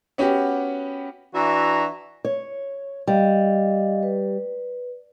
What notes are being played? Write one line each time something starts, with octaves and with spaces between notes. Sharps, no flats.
B3 C#4 F#4 G4
E3 D4 F#4 E5 A#5
C#5
G3 D#5 F5
B4